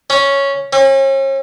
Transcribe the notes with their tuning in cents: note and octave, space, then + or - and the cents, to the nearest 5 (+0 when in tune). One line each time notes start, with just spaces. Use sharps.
C#4 +0
C#4 -40